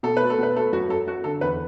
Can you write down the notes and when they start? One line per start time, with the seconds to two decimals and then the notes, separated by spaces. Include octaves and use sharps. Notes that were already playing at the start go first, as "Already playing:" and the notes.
0.03 B2 A4
0.17 A3 B4
0.30 A4
0.38 B2 B4
0.56 A3 A4
0.73 F#2 F#4
0.89 F#2 A4
1.07 F#2 F#4
1.24 D3 A4
1.41 E2 B4